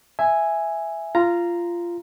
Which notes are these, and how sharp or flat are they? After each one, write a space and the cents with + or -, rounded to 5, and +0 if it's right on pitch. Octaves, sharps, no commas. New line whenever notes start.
E5 +0 G#5 +0
F4 -15 A#5 +0